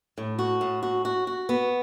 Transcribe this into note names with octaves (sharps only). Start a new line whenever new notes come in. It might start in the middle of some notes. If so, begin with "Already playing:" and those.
A2
F#4
A2
F#4
F#4
F#4
B3